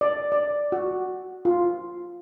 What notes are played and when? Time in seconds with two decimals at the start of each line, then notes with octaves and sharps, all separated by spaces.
0.01 D5
0.32 D5
0.72 F#4
1.45 F4